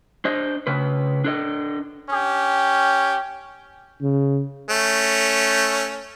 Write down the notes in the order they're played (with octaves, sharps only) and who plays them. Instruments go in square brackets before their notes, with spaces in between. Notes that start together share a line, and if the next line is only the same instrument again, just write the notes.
[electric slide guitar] D4 C5 D#5
C#3 B4
D4 A4 D#5
[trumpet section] C#4 G4
[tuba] C#3
[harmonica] A3 C#4